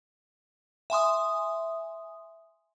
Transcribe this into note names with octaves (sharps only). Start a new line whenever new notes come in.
E5 G#5 C6 D#6